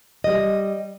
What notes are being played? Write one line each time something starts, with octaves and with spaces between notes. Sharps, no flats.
G3 D#5